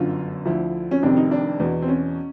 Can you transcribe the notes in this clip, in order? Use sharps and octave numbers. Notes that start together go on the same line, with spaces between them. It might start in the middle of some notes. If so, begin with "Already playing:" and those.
Already playing: G1 F#2 D3 F4
D2 D3 F3 E4
C#4
F1 F2 C3 D#3 D4
D#4
D4
E2 B2
C4
C#4